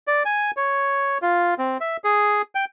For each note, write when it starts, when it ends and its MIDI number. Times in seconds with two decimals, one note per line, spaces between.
0.07 0.23 74
0.25 0.51 80
0.57 1.18 73
1.22 1.54 65
1.58 1.78 60
1.81 1.97 76
2.04 2.42 68
2.55 2.65 79